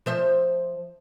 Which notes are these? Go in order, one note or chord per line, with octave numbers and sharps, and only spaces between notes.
F3 C5 E5